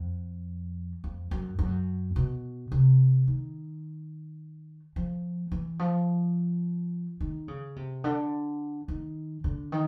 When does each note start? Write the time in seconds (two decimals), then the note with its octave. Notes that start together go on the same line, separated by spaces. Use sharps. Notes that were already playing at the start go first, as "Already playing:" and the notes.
Already playing: F2
1.04 F2
1.31 F#2
1.59 F#2
2.16 B2
2.72 C3
3.28 D#3
4.96 F3
5.52 E3
5.79 F3
7.21 D#3
7.48 C#3
7.76 C3
8.04 D3
8.88 D#3
9.44 D3
9.72 D#3